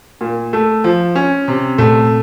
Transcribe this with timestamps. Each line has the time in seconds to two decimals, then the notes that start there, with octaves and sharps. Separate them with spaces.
0.21 A#2
0.53 A3
0.84 F3
1.15 C#4
1.48 C3
1.78 A#2 A3